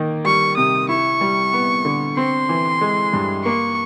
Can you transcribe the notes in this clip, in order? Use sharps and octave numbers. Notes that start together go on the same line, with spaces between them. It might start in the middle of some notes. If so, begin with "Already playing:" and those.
Already playing: D#3 A#3
G3 C#6
C3 D#6
E4 C#6
G3
B3
D3
C4 C6
E3
G#3
G2
A#3 C#6